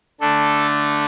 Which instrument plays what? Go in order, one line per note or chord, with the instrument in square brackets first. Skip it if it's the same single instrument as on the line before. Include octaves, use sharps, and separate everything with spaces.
[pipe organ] D3 A3 D4 A4